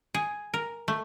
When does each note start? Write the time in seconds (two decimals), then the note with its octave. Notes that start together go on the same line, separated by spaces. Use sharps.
0.14 G#4
0.54 A#4
0.88 A3